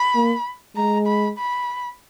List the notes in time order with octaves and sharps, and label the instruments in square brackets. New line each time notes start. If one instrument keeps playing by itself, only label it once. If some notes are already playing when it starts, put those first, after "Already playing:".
Already playing: [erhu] B5
[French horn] A#3
[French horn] G#3 [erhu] A#5
[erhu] B5
B5